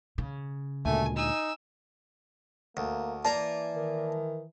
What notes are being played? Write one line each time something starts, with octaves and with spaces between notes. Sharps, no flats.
C#3
D2 A#2 G#3 A3 G#5
D#4 G#5 E6
D2 A#3
E3 A#3 A#4 D5 A5 A#5
D#3